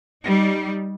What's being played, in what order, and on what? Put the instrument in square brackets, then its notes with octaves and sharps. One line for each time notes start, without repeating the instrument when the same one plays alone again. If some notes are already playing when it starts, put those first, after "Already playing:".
[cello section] G3 D#4